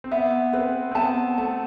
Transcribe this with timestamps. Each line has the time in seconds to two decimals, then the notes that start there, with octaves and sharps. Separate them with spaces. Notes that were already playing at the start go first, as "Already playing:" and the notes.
0.04 C4
0.11 B3 E5
0.53 C4 B4
0.91 C4
0.95 B3 A5
1.38 A3 A5